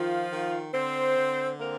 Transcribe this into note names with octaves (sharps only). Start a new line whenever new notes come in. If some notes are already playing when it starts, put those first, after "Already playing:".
Already playing: D#3 F3 F4
D#3
D3 C4 C5
D3
A#3 C4 A#4